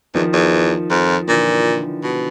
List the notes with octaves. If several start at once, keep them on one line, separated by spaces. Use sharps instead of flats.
E2 D#3 F3
E2
F2
A#2 D3 E3
B2